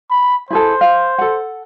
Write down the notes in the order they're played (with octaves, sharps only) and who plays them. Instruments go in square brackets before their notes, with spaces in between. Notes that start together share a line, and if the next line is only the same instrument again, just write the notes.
[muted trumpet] B5
[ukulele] E4 G#4 A4 [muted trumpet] C5
[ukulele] F5
A4 F#5